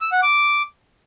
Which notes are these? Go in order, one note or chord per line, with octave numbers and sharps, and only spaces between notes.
E6
F#5
D6